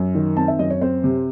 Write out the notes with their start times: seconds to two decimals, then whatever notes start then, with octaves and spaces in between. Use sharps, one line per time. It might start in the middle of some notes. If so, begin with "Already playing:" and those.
Already playing: F#2
0.15 D#3
0.37 C4 A5
0.48 E5
0.59 F#2 D#5
0.70 C#5
0.81 C4 C5
1.04 C3